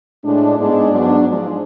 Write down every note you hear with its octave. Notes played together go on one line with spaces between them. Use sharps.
A2 G#3 D4
G#2 G#3 B3 D4
G#2 F#3 B3 D4
G#2 F3 G#3